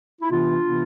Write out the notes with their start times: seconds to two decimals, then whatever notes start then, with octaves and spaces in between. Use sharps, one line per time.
0.21 E4
0.31 C3 E3 B3 D4 F4
0.63 C3 E3 B3